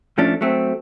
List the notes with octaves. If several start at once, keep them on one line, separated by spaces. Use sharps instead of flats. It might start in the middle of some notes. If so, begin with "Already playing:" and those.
A2 F3 A3 C#4 D4
F#3 A3 C4